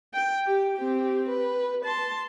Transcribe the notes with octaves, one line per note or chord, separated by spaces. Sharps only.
G5
G4
C4 G4
B4
A5 C6